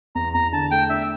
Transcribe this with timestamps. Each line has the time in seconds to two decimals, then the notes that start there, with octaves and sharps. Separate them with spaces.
0.15 E2 A#5
0.34 E2 A#5
0.52 D3 A5
0.71 A3 G5
0.89 D4 E5